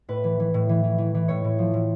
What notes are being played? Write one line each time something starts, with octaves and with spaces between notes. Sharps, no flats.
A2 B4
E3
E3
A2
E3
E3
E3
E3
A2 C#5
A2
F3
A2